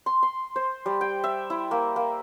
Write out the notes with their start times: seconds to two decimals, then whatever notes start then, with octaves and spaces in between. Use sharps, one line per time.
0.06 C6
0.23 C6
0.56 C5
0.86 G3
1.01 G5
1.24 E5
1.50 E4
1.71 A#3
1.96 A#3